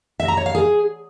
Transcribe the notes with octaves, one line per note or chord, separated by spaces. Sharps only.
E5
A#5
C#5
F5
G#4